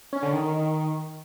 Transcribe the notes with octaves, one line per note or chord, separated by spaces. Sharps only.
C#4
D3
D#3